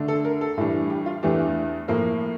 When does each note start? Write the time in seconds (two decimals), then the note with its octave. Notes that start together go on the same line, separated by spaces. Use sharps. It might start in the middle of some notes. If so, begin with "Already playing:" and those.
Already playing: D3 A3 D4
0.08 A4
0.25 A#4
0.41 A4
0.58 A2 E3 G3 D4
0.90 G4
1.06 F4
1.23 E2 E3 A3 D4 G4
1.88 A2 F3 A#3 A#4